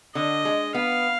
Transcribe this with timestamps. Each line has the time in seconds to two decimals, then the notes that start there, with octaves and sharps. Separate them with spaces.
0.15 D3 D#5
0.45 G#3
0.74 B3 F5